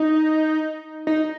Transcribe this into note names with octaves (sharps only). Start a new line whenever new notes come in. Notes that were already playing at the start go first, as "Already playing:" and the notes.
Already playing: D#4
D#4